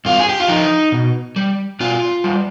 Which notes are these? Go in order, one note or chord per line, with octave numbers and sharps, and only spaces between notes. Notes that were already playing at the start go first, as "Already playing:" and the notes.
G2 F4
G#4
G4
F4
F3 D#4
B2
G3
B2 F4
G3